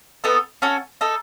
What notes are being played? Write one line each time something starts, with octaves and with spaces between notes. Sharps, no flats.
B3 D#4 A4
C#4 F#4 A4
D#4 A4